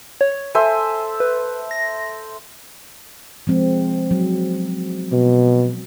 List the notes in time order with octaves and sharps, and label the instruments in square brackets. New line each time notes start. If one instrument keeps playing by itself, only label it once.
[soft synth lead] C#5
[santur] A4 C5 E5 [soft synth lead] G#5
[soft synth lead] B4
A#6
[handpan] F3 G#3 C4
F#3
[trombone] B2